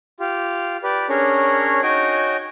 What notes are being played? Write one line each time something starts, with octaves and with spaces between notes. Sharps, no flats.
F4 G4
G4 B4 D5
C#4 D4 G#4 A#4 C#5
D#4 F#4 C#5 D#5 G5 G#5